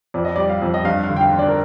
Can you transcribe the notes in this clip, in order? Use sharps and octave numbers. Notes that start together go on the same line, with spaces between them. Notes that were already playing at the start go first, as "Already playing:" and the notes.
F2 D5
D#5
G3 D5
F5
F2
D#5
G2 F5
F5
D3
G5
F5
D3
D5
A#4